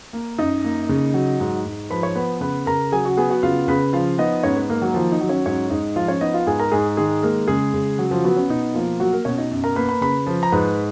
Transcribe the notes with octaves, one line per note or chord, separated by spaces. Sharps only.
A#3
F#2 D#4 D#5
A#3
C#3
F#3
G#2
G#2
F3 B4 B5
C#5 C#6
B3 B4 B5
C#3 B4 B5
C#3 A#4 A#5
F#3 G#4 G#5
F#4 F#5
B3 G#4 G#5
F#4 F#5
C#3 F4 F5
C#3 B4 B5
F3 F4 F5
B3 D#4 D#5
G#2 C#4 C#5
B3 B4
A#3 A#4
F#3 F#4
D#3 F3 F4
D#4
F#3
C#4 C#5
G#2 C#4 C#5
G#2 D#4 D#5
F3 F4 F5
C#4 C#5
B3 D#4 D#5
F4 F5
G#2 G#4 G#5
A#4 A#5
G#2 G#4 G#5
D#3 G#3 G#4
G#3 A#3 A#4
C#3 G#3 G#4
C#3
F#3
F3 F4
F#3 B3 F#4
C#4
B2 D#4
F3 A#3 F4
F#3 A#3 F#4
A#3 A#4
B2 C#4 C#5
D#4 D#5
F#2
A#4 A#5
A#3 B4 B5
B4 B5
C#3 B4 B5
F3
A#5
G#2 B4 B5